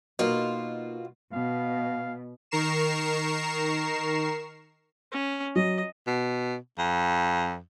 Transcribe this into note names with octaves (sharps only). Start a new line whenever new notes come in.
B2 A#3 D#4 F4 F#4 A#4
B2 F5
D#3 A#4 A#5 C#6 C7 E7
C#4
F#3 D#5
B2
F2